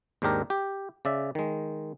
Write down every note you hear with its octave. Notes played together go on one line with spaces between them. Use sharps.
D#2 G#2 D4 G4 A#4
G4
C#3 D5 E5
D#3 G#3